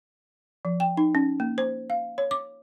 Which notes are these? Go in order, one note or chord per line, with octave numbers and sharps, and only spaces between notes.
F3
G5
D#4
C#4
A#3
C5
F5
C#5
D6